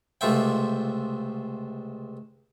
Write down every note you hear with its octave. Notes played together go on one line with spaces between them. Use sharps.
C#2 C3 A3 F4 E5 G5